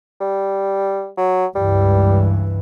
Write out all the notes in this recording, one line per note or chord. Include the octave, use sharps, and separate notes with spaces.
G3
F#3
C#2 G2 E3 G3